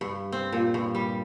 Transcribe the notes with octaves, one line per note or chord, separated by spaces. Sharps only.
G2
C4
A#2
G2
G3